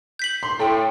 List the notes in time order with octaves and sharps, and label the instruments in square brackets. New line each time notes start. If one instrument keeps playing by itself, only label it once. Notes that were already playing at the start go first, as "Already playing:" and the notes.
[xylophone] G6 B6 F#7
[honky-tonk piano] C6
[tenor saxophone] A2 [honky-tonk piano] A4 C6 [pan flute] G5